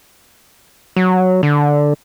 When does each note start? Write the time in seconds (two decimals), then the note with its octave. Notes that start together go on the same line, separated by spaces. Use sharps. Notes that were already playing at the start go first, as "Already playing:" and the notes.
0.96 F#3
1.43 D3